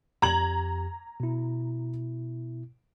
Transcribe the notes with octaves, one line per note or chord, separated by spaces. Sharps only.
F2 G4 A#5 G#6 F#7
B2 E4